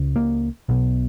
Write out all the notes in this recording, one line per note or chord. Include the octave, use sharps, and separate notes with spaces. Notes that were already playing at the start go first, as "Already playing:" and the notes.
Already playing: C#2 C#3
A#3
B1 B2